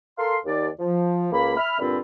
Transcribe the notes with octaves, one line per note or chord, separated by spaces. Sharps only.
A4 A#4 F5 C6
D#2 D5
F3
C#2 A#3 B5
E5 B5 F6
G2 A#2 D3 C4 F4 B5